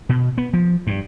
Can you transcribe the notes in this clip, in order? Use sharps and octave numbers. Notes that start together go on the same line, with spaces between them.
B2
B3
F3
G2